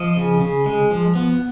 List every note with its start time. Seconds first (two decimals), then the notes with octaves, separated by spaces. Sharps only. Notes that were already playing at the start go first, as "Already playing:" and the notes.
Already playing: F3 D#5
0.17 C#3
0.41 C#3
0.66 G#3
0.91 F3
1.15 B3